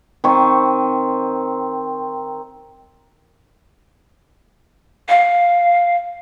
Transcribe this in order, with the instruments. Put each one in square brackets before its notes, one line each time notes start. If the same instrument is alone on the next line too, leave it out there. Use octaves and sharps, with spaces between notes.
[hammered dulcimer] D#3 C4 C#6
[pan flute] F5